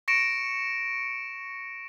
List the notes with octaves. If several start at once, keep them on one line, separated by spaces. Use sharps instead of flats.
C#6 A#6 C#7 D7 E7